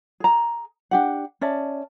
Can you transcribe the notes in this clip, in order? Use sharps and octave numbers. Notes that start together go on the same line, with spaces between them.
G#4 A#5
D4 G4 F#5
C#4 D5 E5 A5